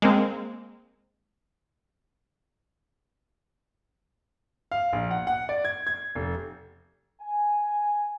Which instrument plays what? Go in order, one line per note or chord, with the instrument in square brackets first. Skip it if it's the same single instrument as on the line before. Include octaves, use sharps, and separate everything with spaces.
[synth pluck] G#3 A#3 C4
[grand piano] F5
A#1
F#5
F#5
D5
G#6
G#6
F1
[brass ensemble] G#5